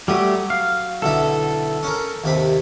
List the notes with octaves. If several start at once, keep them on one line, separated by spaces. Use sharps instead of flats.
F#3 G3 A3 G4 D#6
F5
B1 D3 E4 A4
C#4 A#4
D#2 C3 B5